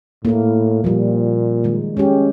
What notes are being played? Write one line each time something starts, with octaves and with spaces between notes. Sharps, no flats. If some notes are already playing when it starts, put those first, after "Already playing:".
A2 A#3 E4
A#2 F3 G3
D#3 G#3
G#3 C#4 G4